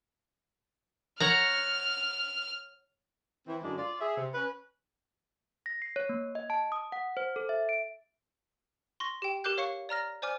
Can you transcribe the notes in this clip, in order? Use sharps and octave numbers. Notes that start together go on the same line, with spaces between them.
C#5 F#5 A#5 F6
E3 C4
F#2 D3 G#3 D4
F4 D5
G#4 E5
C3
C#4 B4
A#6
C7
C#5
A#3
D#5
A5
D#6
F#5
C5
A4
E5
D7
C6 C#6 A#6
G4 G5
G4 A#4 D6 F#6 G6
C#5 F5 C#6 C#7
D5 A#5 F6 A#6
C5 D5 G#5 D6 F6